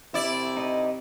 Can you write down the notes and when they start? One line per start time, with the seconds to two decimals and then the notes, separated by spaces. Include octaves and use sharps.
0.14 C3 E4 D5
0.57 D#4 D#5